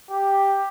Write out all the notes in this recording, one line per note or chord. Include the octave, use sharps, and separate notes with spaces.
G4